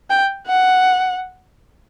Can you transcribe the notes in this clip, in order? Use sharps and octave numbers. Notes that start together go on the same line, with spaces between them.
G5
F#5